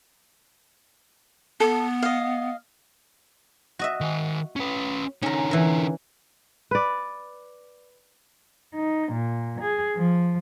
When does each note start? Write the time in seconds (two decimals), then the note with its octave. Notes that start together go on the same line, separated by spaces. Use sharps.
1.60 B3 A4
2.02 D#5 F5
3.79 F#4 D#5 E5
4.01 D#3 G#5
4.56 C#4 B4
5.23 D3 C#4 D#4 A#4
5.51 E3 A#4
6.71 B4 D5
8.74 D#4
9.11 A#2
9.60 G#4
9.97 F3